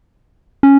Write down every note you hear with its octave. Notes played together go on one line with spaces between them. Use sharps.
C#4